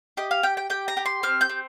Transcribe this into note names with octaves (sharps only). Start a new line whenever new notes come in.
G4 D#5
F5
G4 G5
G5
G4 G5
A#5
G4
C6
C4 F6
G6
C4